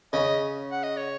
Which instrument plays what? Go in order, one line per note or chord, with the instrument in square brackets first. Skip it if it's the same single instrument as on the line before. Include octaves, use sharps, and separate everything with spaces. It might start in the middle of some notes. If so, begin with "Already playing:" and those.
[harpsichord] C#3 [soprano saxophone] D#5
[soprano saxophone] F#5
D#5
C#5